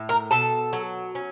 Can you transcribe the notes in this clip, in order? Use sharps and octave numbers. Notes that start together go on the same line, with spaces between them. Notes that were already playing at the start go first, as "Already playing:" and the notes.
Already playing: A2
A#4 A#5
B2 A4 A5
F#3
C#4